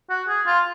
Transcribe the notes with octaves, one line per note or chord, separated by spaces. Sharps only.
F#4
G#4
F4